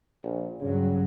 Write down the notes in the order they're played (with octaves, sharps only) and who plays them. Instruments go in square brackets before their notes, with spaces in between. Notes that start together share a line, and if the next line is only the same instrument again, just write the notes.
[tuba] A#1
[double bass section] G2 F#3 [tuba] C#3